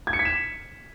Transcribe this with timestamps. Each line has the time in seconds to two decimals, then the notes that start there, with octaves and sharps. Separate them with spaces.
0.07 G#6
0.13 C#7
0.19 B6
0.25 E7